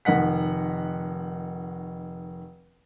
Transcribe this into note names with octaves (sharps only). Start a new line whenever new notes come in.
F1 D#3 D#5 F#5 B6